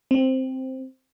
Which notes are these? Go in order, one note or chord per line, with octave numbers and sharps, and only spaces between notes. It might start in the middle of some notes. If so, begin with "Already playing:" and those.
C4